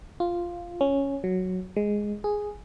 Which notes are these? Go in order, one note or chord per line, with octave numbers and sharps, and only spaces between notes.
F4
C#4
F#3
G#3
G#4